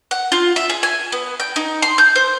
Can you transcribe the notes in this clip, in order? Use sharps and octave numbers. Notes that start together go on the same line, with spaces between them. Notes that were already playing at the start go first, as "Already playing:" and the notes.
F#5
F4
E5
G#4
G#5
B3
G5
D#4
C6
G6
C5